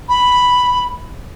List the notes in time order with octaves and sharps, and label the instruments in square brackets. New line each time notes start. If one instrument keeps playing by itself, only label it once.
[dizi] B5